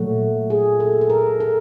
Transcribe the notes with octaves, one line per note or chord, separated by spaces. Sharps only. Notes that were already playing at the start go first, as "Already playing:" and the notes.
Already playing: A#2 F#3 A3 F#4
G#4
A4
A4
A#4
A4